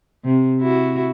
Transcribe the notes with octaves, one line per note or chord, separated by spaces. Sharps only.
C3
E4 F#4